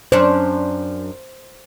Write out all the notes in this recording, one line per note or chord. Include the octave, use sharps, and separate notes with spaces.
F#2 C#4 D4 C5